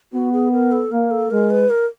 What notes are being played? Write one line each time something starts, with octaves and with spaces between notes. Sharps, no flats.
B3 F#4
G#4
A#4
A4
A#3 A#4
A4
G#3 A#4
B4
A#4